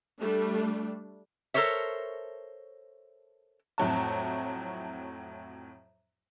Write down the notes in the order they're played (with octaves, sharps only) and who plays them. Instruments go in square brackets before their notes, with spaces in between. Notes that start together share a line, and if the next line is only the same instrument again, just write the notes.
[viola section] G3 A3 D4
[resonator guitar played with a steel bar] A4 A#4 C5 C#5 E5
[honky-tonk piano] F2 A2 F#3 A5